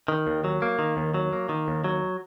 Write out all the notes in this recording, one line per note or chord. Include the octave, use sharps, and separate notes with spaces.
D#3
D#2
F#3
A#3
D#3
D#2
F#3
A#3
D#3
D#2
F#3